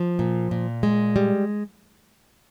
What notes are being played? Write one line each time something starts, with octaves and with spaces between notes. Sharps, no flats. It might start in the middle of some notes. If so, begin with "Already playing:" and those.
Already playing: F3
A#2
A#2
G#3
G3